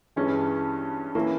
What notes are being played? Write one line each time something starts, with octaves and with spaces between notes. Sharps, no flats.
G2 E3 G#3 C#4
E3 A#3 C#4 E4